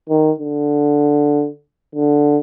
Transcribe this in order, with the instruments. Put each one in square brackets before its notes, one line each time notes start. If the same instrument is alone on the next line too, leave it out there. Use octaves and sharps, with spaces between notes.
[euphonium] D#3
D3
D3